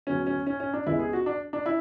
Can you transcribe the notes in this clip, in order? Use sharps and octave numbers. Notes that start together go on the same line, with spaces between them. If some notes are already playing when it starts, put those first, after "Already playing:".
D2 C#3 F#3 B3 C#4
C#4
C#4
C#4
D4
C#2 C#3 G#3 B3 E4
G#4
F#4
D4
D4
C#4 E4